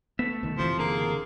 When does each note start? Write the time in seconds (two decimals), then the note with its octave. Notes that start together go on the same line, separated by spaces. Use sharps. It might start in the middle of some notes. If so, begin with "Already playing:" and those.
0.19 A3 B3 E5
0.43 C2 D#3
0.58 F#1 C3 E3 F3
0.79 D3 A#3 G#4